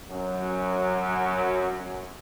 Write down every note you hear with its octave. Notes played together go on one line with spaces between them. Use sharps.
F#2 F#3